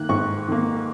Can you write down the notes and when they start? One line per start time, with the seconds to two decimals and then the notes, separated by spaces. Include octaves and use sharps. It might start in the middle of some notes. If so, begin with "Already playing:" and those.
Already playing: D#3 A#3 F#6
0.09 G#2 C#6
0.48 D#3 A#3